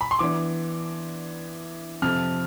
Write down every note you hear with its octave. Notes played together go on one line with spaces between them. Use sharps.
B5
C6
E3 B3 D4 D6
F2 C3 F3 F6